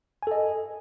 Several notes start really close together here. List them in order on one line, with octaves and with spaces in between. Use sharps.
G#5 A4 D#5